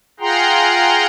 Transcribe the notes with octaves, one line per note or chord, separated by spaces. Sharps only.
F4 G#4 F#5 G5 A#5 C6